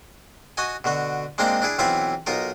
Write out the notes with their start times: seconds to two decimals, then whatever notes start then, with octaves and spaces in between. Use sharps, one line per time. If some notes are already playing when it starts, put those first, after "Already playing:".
0.57 F#4 D#5 G#5
0.84 B2 D3 F#4
1.38 G#3 A#3 C4 D4 D#4 C5
1.62 D4 E4 G#4
1.79 B1 E3 C4 E4 F4 E5
2.26 B1 D#4 F4 A#4